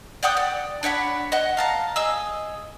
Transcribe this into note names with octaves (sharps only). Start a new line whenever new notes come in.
D5 F#5 G5 D#6
D5
D4 C#5 F#5 B5
D#5 F#5
F5 A5 A#5
G#4 D#5 E6